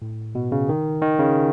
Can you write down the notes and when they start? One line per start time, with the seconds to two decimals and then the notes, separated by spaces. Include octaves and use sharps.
0.02 A2
0.35 B2
0.52 C#3
0.69 D#3
1.02 D#3
1.19 C#3